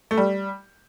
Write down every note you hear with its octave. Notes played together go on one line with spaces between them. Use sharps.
A3
G3